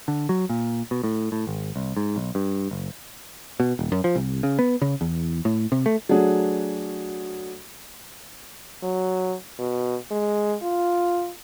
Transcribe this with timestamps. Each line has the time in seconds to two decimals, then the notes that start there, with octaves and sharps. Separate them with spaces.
0.08 D3
0.29 F#3
0.50 A#2
0.91 B2
1.03 A2
1.32 A2
1.47 G#1
1.76 C2
1.97 G#2
2.16 B1
2.35 G2
2.71 F#1
3.60 B2
3.79 D#1
3.92 F#2
4.04 F3
4.16 C2
4.43 C#3
4.59 B3
4.82 C#3
5.01 E2
5.45 A2
5.72 C3
5.86 A3
6.09 F#3 A3 D4 F#4 G#4
8.83 F#3
9.59 B2
10.11 G#3
10.62 F4